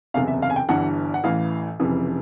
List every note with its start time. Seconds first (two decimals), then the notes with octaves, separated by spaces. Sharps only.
0.14 F#1 E2 C3 F5
0.28 E5
0.42 F5
0.50 G#5
0.56 G5
0.69 G1 G2 E3 F#5
1.14 F#5
1.24 A1 A2 E3 F5
1.80 F1 F2 C#3 E3